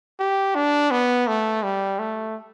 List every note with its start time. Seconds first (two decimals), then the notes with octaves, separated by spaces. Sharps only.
0.20 G4
0.55 D4
0.91 B3
1.27 A3
1.63 G3
1.99 A3